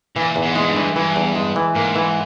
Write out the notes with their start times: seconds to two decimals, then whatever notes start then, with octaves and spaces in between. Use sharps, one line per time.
0.16 A#2 E3
0.36 E2
0.42 G#2
0.55 A#2 G#3
0.61 G#2
0.69 G2
0.76 E3
0.96 G2 E3
1.16 E2
1.35 G#3
1.56 E3
1.76 G#2 A#3
1.96 E3